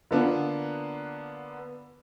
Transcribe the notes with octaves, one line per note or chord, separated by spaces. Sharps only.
D3 A#3 B3 D4 F4